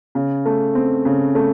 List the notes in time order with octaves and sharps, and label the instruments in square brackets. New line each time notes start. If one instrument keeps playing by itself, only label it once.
[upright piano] C#3
A3
C4
C#3
A3